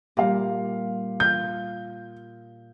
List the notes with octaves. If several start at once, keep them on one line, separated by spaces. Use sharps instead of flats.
A#2 G3 G4 F5
F4 G6